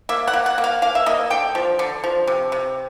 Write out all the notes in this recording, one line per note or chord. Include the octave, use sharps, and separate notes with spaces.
A#3 E5
F#5
A#3
F#5
A#3
F5
A#3 F5
E5
A#3 D#5
D3 G5
F3
D3
F3
C3
C3